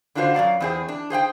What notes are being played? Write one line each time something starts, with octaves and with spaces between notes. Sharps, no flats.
D3 D4 F4 F#4 G#4 C5
F#2 A3 D5 F5
E2 C4 G#4
D4
G#4 C5 F#5 G5